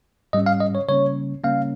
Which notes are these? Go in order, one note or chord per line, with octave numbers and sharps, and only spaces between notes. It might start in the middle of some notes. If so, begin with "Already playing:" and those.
G#2 G3 C#4 D#5
F5
D#5
C#5
C#3 G3 A#3 C#4 C#5
C#3 G3 A#3 C#4 F5